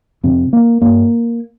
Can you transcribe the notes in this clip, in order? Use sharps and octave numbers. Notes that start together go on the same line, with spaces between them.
F2 C3 C4
A#3
G2 A#3